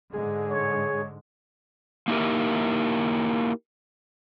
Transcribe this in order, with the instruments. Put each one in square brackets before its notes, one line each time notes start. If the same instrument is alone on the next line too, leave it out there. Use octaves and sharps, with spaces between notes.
[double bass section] G#2 D3 G#3 [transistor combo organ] G#4
[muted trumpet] C#5
[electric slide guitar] A#3 D#4 E4 G4 A#4